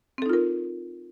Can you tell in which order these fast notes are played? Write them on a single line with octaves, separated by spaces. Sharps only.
C4 A4 D#4 F4 A#4